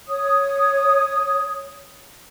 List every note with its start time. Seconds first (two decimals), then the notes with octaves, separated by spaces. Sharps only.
0.07 C#5 D#6